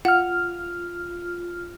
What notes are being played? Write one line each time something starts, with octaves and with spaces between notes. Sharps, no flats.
F4 F#5 F6